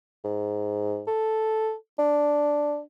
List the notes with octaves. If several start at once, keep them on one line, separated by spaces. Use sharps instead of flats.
G#2
A4
D4